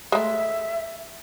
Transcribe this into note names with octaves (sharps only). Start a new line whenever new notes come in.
G#3 A3 E5